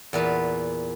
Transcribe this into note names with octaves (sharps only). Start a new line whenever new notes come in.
E2 A#2 B4